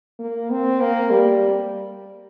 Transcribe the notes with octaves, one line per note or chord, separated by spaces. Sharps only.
A#3
C4
A#3
G3